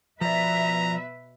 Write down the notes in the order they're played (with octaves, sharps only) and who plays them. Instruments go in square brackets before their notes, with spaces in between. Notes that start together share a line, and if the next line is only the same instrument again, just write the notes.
[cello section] B2 B4 E5 [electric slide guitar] F3 D5 [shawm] A#5